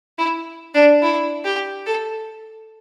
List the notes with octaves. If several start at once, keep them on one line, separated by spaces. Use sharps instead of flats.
E4
D4
E4
G4
A4